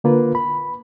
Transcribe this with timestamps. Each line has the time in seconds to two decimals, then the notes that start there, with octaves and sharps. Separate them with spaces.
0.04 D3 A#3 F4 B4
0.35 B5